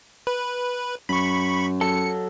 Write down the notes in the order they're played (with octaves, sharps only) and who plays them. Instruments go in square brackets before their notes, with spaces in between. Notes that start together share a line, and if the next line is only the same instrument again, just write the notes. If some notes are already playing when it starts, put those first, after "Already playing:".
[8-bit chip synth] B4
[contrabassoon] F#2 [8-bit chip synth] B5 C#6
[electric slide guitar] F#3 A4 A5 [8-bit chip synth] C#7